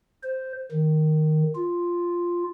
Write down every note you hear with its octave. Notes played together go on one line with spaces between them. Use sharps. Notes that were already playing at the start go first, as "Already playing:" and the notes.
C5
D#3
F4